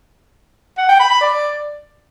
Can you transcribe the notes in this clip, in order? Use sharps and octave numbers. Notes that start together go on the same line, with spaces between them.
F#5
G5
B5
B5
D5